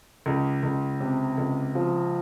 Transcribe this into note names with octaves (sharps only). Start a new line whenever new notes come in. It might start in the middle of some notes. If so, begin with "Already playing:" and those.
C#2
C#2
C3
C#2
F3